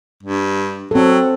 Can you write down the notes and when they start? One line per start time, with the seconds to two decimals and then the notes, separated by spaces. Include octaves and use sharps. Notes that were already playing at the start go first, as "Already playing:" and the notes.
0.23 G2
0.91 F#3 C4 A4